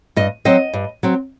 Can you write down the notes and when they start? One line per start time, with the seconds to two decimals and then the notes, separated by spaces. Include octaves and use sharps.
0.16 G2 D#5
0.45 F#3 C4 D#5
0.73 G2
1.03 F#3 C4